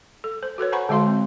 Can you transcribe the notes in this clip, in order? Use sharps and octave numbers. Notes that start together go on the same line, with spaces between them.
A4
C5
F#4 A4 B4 C#5
C5 F#5 G#5 A#5 B5 C#6
D3 G#3 F#4 F5 C6
C4